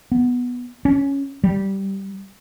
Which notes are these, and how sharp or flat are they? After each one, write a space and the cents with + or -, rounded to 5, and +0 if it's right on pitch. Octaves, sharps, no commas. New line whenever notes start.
B3 -5
C#4 +0
G3 -10